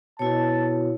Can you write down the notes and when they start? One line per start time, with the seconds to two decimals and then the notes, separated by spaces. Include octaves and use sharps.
0.19 B2 E4 C#5 A5